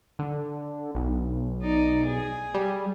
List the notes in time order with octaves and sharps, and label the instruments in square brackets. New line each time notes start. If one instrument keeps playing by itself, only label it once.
[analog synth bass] D3
B1
[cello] D#4 D5
G#4
[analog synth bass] G3